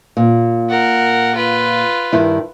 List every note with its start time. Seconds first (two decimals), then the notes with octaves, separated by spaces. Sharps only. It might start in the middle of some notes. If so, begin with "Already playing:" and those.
0.17 A#2
0.69 A#4 F#5
1.35 F4 B4
2.13 G2 D#3 E4